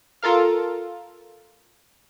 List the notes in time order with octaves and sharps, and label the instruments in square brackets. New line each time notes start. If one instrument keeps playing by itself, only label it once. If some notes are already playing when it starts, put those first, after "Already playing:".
[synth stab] F4 A4 A#4 F5